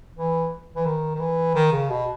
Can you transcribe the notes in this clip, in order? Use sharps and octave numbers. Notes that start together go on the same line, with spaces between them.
E3
E3
D#3
D#3
E3
D#3
C#3
B2